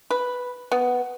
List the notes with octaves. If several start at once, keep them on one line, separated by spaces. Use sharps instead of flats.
B4
B3